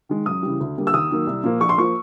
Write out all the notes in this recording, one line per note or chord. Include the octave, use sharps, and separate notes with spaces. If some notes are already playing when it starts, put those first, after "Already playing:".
D#3 G#3
F#2 D#6
C#3 E3 G3
D2
D3 G3 A#3
E6
D#2 D#6
D#3 F#3 A#3
C2
A#2 F3 A#3
A#1 C#6
C6
F3 A#3 C#6